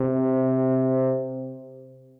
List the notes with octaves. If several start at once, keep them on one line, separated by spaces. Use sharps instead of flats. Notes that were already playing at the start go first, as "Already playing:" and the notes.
Already playing: C3